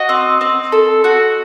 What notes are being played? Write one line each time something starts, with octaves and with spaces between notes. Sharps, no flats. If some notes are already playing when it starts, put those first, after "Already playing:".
Already playing: F#4 D#5
C4
C4
A4
F#4